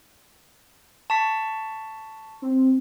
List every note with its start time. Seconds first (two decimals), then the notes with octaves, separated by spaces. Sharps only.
1.10 A5 C#6 B6
2.42 C4